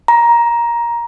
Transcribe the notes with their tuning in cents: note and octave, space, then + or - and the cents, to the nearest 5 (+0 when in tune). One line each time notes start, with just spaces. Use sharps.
A#5 +15